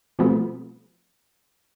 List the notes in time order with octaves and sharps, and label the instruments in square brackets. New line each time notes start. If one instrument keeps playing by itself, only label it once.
[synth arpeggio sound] B2 F3 G3 A3 B3 C4